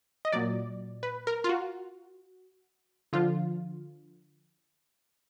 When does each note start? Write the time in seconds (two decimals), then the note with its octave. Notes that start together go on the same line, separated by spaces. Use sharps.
0.25 D#5
0.32 A#2 F#3 D5
1.03 B4
1.27 A#4
1.44 F4
1.49 F#4
3.13 D3 F3 F4